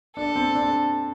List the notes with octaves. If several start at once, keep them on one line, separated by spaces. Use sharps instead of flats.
D4 A4
C4
D4